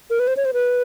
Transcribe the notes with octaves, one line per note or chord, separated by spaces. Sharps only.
A#4
B4
C5
C#5
C5
B4